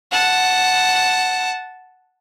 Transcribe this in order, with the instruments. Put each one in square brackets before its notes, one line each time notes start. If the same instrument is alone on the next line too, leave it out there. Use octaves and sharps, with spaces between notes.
[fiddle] F#5 A5